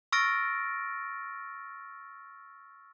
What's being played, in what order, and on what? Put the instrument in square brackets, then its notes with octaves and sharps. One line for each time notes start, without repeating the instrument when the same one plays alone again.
[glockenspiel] C#6 E6 F6 A6 A#6 D7